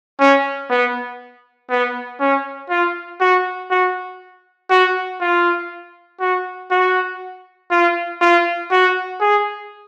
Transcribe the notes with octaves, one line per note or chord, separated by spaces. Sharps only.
C#4
B3
B3
C#4
F4
F#4
F#4
F#4
F4
F#4
F#4
F4
F4
F#4
G#4